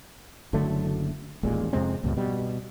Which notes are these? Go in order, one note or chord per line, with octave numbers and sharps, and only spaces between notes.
F#1 D3 F#3 A3
D#1 A1 A#2 G#3
F2 C3 G#3 C4
C#2 G2 A#2
B2 G3